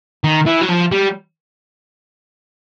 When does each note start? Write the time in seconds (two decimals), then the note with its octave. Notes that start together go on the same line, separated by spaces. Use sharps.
0.24 D#3
0.46 E3
0.62 F#3
0.69 F3
0.92 G3